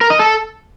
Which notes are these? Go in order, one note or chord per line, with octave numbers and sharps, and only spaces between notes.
A#4
D#5
A4